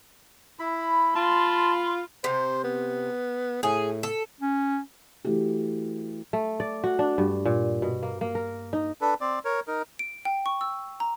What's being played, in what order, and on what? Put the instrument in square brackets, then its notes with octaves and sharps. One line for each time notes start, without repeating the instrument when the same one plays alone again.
[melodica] E4 B5
[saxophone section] F4 [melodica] A5 [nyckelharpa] B5 C6
[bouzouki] C3 [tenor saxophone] C5
[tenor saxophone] B3
[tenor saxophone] A2 [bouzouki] G#4
[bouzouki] A4
[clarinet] C#4
[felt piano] E3 A3 F#4 G4
[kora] A3
D5
F#4
D4
G2
A#2
B2
A#3
A#3
A#4
D#4
[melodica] D4 A4 B4
C4 D5
A#4 C#5
D#4 A#4
[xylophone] D7
G5
C#6
E6
A#5